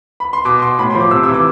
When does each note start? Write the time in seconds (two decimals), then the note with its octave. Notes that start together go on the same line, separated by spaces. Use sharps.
0.20 B5
0.33 C6
0.45 B2 D6
0.62 C6
0.79 A2 B5
0.90 C6
0.95 F3
1.00 D6
1.11 C3 E6
1.23 E3 E6
1.34 D6